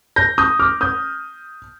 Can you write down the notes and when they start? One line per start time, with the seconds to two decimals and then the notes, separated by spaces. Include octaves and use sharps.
0.16 G6 A#6
0.38 D#6 G6
0.59 D6 F6
0.81 D#6 G6